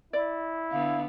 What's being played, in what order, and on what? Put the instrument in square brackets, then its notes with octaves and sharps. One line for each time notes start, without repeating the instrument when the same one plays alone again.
[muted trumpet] E4 [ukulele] D5
[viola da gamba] D3 B3 [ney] F5